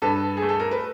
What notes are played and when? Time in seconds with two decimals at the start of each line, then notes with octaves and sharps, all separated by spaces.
0.02 G2 A4 B4
0.37 G#4
0.42 A3
0.49 A4
0.60 A#4
0.71 B4